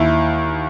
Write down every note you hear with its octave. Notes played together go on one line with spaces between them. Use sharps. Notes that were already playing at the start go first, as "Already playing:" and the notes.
Already playing: D#2 E4